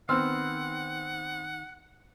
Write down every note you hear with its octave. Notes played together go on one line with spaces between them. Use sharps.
D#3 B3 C4 F#5 C6 E6 F6